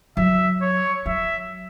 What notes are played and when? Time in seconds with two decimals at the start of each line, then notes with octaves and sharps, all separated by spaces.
0.17 F#3 E5
0.62 C#5
1.06 F#3 E5